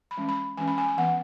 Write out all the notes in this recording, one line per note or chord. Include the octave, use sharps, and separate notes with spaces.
B5
E3 G#3 C#4
B5
E3 G#3 C#4 G#5
B5
G#5
G#5
E3 B3 F#5